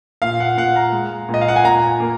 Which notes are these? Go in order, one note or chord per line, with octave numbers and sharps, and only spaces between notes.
A#2 F5
F#5
A#2 F#5
A#5
G#3
A#2
D#5
F5
F#5
G#5
A#2 A#5
A#3